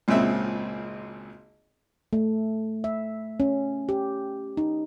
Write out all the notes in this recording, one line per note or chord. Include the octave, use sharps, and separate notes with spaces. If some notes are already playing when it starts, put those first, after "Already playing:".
G#1 C#2 A#2 C#3 C4 E5
A3
E5
C#4
G4
D#4